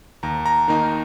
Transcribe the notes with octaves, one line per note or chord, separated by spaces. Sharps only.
D#2 A#5
A#5
D#3 A#3 D#4 A#5